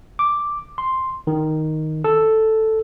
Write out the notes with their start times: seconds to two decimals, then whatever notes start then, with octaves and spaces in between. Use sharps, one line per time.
0.19 D6
0.78 C6
1.27 D#3
2.04 A4